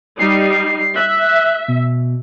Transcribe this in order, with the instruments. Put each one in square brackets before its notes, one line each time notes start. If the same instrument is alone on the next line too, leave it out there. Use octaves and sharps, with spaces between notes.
[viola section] G3 D#4 [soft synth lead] C7
[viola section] E5 [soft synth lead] F#6
[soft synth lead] B2